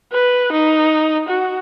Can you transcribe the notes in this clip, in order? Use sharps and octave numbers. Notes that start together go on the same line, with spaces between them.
B4
D#4
F#4